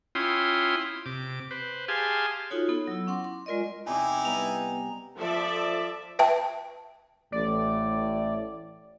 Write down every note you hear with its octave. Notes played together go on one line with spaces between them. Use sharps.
C#4 E4 F4 G5 C6 D#6
C3 D6
B4 C5
G4 G#4 F5 G#5 A5 C6
D#4 F4 F#4 A4 C#5
B3 D#4 A4
F#3 E4
C#4 F#5 C6 D6
C6
G#3 F4 A#4 D5 D#5
E2 C3 D#4 E4 G#5 D6
G3 B3 D#5 A#5 F7
F3 A4 D5 E5
B4 E5 G5 A5
A1 A2 D5